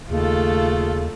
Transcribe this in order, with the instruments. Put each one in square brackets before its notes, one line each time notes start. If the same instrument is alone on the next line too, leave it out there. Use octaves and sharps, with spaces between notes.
[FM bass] D#2 [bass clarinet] C#3 [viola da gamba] A3 [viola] F4 A4